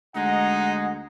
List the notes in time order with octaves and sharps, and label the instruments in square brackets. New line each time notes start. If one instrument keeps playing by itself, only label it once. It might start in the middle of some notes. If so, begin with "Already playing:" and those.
[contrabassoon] D2 [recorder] G#3 [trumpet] D#4 [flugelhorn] F#5